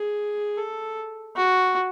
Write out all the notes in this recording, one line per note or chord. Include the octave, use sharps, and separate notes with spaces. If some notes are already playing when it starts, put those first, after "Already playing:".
Already playing: G#4
A4
F#4